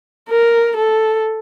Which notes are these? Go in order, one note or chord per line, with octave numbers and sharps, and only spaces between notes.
A#4
A4